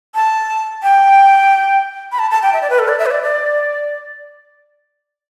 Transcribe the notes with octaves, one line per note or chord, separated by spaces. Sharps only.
A5
G5
B5
A5
A5
G5
E5
D5
B4
A4
D5
E5
B4
D5
D5